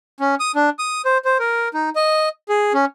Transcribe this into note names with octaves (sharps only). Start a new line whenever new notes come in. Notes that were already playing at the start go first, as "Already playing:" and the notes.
C#4
D#6
D4
D#6
C5
C5
A#4
D#4
D#5
G#4
C#4